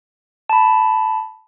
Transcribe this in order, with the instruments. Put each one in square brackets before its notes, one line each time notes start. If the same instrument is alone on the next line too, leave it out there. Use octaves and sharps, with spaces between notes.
[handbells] A5 B5